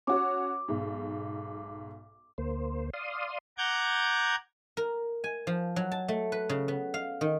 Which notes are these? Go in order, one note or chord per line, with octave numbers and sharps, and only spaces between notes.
C#4 F#4 C#5 D6
B1 G#2
D2 A#3 C5
D5 F5 C6 D#6
F#5 A#5 D6 G6 G#6
A#4
G#5
F3
F#3
A5
A3
B4
C#3
B3
F5
D#3